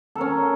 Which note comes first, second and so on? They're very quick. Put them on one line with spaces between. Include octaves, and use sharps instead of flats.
A4 A#4 C#4